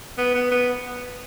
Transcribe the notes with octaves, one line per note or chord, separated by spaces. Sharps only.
B3
B3
B3